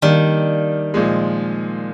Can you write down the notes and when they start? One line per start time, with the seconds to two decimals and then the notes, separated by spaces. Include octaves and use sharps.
0.02 D#3 G3 A#3 D4
0.94 A#2 F3 G#3